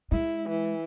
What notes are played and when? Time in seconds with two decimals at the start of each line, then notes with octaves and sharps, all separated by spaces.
0.12 G#3 E4
0.49 E3